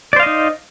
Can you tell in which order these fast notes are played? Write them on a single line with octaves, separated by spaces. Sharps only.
D5 C5 F5 D#5 D#4